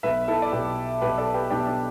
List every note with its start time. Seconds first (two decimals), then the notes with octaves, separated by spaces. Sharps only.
0.03 B1 B2 B4 E5
0.28 E4 A4
0.42 D5
0.52 B1 B2 G4 B4
1.01 B1 B2 G4 B4
1.18 A4 D5
1.34 G4 B4
1.50 B1 B2 D4 G4
1.67 D4